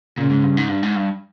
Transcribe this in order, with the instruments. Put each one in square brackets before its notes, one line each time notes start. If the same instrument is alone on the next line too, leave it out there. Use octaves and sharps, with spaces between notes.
[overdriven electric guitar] A#2 [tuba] C#3
[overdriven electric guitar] G#2
G2
G#2
G2
G#2
G2